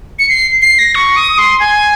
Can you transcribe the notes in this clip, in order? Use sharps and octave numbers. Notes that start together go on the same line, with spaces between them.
C#7
C7
C7
A#6
C#6
D#6
C6
G#5